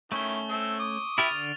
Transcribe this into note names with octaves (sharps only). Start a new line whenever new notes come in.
D#3 A3 C#4 E4 C#6 G7
C4 A4 E5
D6 D#6
E4 G4 E5 F6 A6 F7
D3